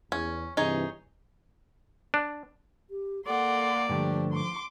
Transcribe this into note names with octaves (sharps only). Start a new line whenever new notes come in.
E2 C#4
G2 C3 E3 D#4 G#4 C#5
D4
G4
A#3 A4 D5 F#5 C6
G2 D3 F3 A3 D4 G4
C6 D6